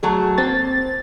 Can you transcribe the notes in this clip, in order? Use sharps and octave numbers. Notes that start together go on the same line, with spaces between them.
F#3 A3 G#4
A#3 C4 A6